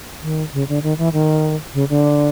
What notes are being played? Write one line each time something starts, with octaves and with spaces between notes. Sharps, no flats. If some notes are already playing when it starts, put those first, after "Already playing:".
D#3
C#3
D3
D#3
E3
D#3
C#3
D3